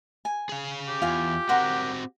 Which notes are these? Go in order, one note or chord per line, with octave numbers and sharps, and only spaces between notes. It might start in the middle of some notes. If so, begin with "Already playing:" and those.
G#5
G#4 F5
G4
E2 F4 F5 G#5
C4 F#4 A#4 F#5 C6